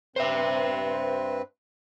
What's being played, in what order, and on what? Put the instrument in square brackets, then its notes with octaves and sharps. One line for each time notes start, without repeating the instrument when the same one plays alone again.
[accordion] G2 C4 B4 [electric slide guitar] C5 E5